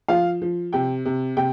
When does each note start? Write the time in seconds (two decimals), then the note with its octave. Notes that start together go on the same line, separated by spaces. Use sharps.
0.08 F3 F5
0.41 F3
0.73 C3 G5
1.05 C3
1.37 C3 G5